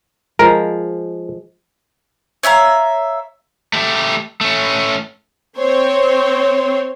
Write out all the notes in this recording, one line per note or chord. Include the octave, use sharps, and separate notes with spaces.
F3 G#3 A#4
C#5 E5 F5 A#5
A3 G4
A3 C#4
C4 C5 C#5